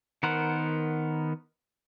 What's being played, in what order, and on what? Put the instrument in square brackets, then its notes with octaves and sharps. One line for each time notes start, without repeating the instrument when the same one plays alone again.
[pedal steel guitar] D#3 B3 A#4 C5 F#5